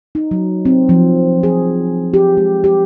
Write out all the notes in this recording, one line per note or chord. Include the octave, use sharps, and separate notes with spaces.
D#4
F#3
C4
F3
G#4
G4
G#3
G4